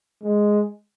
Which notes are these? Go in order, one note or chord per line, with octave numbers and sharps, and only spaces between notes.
G#3